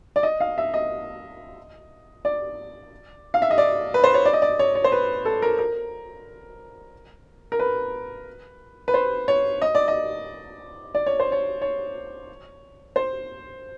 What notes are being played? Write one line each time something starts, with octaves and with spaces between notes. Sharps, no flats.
D5
D#5
F5
E5
D#5
D5
F5
E5
D#5
D5
B4
C5
C#5
D5
D#5
D5
C#5
C#5
C5
B4
A4
A#4
A#4
A#4
B4
B4
C5
C#5
D#5
D5
D#5
D5
C#5
C5
C#5
C#5
C5